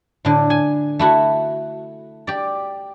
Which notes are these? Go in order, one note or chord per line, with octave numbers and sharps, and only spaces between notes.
A2 D3
G#5
A3 E4 F#4
G4 D5